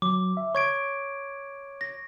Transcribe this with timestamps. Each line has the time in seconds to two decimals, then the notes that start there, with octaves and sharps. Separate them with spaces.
0.02 F#3 D6
0.37 E5
0.55 C#5 C#6 G#6 D7
1.81 A#6